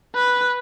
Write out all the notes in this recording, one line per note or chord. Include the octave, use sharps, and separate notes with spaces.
B4